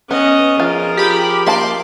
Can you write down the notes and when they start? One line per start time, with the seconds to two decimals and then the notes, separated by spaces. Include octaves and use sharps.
0.11 B3 C#4 D#5
0.60 F3 F4 G#4 A#4
0.97 G4 B5
1.46 A#3 F5 A5 C6 D6